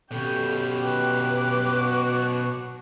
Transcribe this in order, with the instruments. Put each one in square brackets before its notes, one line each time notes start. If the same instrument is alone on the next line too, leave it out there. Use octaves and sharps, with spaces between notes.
[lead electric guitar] B2 C#4 [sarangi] G4 [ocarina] A4 [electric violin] G6
[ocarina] B4 [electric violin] D6 F#6
[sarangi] F#4